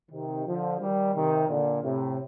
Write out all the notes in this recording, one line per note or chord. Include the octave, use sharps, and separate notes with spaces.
C3 D#3
D3 F3
D#3 G3
C3 D#3
A#2 D3
A2 C3